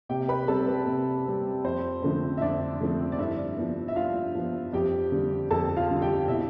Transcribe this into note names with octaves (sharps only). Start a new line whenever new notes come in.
C3 G4 G5
B4 B5
G3 C4 A4 A5
B4
C3
G3 C4
F2 C5
D3 F3 A3 C4
E5
F2 D4 D5
D3 F3 A3 C4
D5
G2 E4 E5
F3 B3
E5
G2 F4 F5
F3 B3
F2 G4 G5
D3 G3
F2 A4 A5
F4 F5
D3 G3
G4 G5
B2 E4 E5